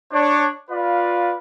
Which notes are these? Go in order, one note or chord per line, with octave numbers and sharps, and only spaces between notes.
D4 C#5
F4 B4 D5 F5